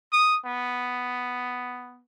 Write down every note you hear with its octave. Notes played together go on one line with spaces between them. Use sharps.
D#6
B3